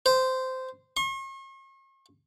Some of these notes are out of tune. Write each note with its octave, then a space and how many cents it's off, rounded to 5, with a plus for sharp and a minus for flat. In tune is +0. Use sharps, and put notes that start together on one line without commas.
C5 -15
C#6 -45